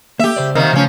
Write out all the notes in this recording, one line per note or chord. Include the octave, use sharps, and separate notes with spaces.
A3 A#3 G4 E5
C#3 C5 D5
C3 D#3 A#3
C#3 F3 A3 C#4